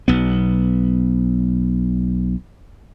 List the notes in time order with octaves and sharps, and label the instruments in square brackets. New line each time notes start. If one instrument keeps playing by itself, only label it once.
[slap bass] B1 B3